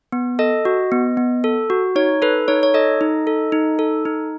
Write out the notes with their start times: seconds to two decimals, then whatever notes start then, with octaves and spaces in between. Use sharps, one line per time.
0.12 B3
0.39 A4 D#5
0.65 F#4
0.92 B3
1.17 B3
1.44 A4
1.70 F#4
1.96 D#4 C#5
2.22 A4 B4
2.48 D#4 C#5
2.63 C#5
2.74 A4 D#5
3.01 D#4
3.27 A4
3.52 D#4
3.79 A4
4.05 D#4